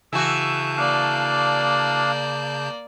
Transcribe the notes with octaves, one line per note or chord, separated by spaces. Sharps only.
C#3 E3 F#4 A5 E6 G6
A#3 D4 D5 F5